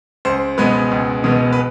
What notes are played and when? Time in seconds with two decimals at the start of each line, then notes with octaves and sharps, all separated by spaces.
0.25 C#2 C5
0.58 B2 G#3 B3 B4
0.92 C#2
1.24 B2 G#3 B3
1.53 B4